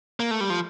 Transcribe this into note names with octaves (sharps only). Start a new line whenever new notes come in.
A#3
A3
G3
F3